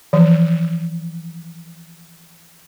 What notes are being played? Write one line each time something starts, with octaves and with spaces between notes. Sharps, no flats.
E3 F3